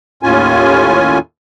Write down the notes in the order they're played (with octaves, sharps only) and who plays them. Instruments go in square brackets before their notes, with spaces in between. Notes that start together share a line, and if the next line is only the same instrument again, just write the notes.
[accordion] D#2 A2 C#4 F4 G#5